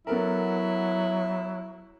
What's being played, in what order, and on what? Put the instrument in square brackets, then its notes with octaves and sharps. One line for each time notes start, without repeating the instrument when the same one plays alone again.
[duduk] F#3 [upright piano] B3 A4 A#4 [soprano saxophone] E4